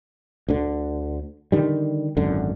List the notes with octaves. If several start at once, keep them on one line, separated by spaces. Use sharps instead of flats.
D2 D3
D3 D#3 G3
G#1 F#2 D3